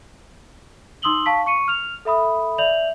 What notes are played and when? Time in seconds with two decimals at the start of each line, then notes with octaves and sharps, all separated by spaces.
1.02 D#4 C6 D#6 E6 F#7 G7
1.26 F5 A5 C#6 B6
1.46 C#6 C#7 D#7
1.68 F6 F7
2.05 A4 E5 B5 D#6
2.58 D5 E5 G6 F7 F#7